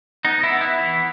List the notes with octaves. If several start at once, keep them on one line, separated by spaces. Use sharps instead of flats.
B3 D#4
E4
B3
E4
E3